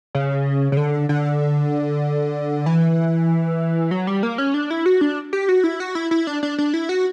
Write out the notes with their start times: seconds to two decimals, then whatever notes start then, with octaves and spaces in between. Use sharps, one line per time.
0.15 C#3
0.72 C#3
0.77 D3
1.09 D3
2.66 E3
3.91 F#3
4.07 G3
4.23 A#3
4.38 C#4
4.54 D4
4.70 E4
4.86 F#4
5.01 D4
5.33 G4
5.49 F#4
5.64 E4
5.80 F#4
5.95 E4
6.11 E4
6.27 D4
6.43 D4
6.58 D4
6.74 E4
6.89 F#4